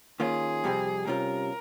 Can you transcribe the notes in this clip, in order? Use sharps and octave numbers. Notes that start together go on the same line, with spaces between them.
D#3 A#3 C#4 F4 G#4
F2 C3 G3 C4 G4
C3 G3 C#4 F4 A#4